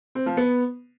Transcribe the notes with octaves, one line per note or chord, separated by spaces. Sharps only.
C4
F3
B3